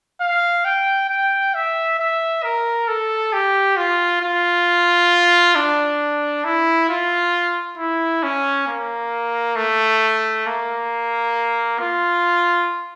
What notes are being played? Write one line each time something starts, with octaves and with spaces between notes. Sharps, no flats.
F5
G5
G5
E5
E5
A#4
A4
G4
F4
F4
D4
E4
F4
E4
C#4
A#3
A3
A#3
F4